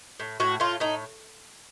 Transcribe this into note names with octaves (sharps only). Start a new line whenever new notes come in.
A2
A2 F#4
A2 F4
A2 D#4